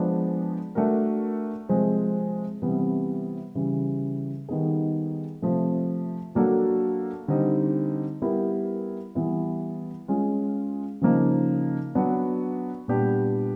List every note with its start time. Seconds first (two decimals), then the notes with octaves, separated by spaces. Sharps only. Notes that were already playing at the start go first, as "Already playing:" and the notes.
Already playing: F3 G#3 B3 D4
0.75 A3 D4 F#4 A#4
1.69 C3 F3 G#3 C4
2.62 C3 E3 G3 B3
3.55 C#3 E3 G3
4.49 D#3 G3 B3 D#4 G#4
5.42 C3 F3 A3
6.35 F#3 A#3 D4 F#4 A4
7.28 D3 G3 C4 D#4
8.22 G3 B3 E4 G4 A#4
9.15 E3 G3 B3 E4
10.08 G#3 C#4 F4
11.01 C#3 F3 A#3 D#4
11.95 F#3 B3 D4 F#4
12.88 A#2 G3 B3 D4 G4